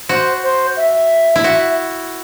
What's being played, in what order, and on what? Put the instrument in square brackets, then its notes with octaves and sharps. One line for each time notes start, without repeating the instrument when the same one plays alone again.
[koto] F#4 [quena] C5
[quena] C5
E5
[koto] E4
F#4